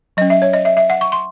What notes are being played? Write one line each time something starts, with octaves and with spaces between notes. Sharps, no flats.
F#3 C#4 D#5
E5
C#5
D#5
E5
E5
F#5
C#6
C6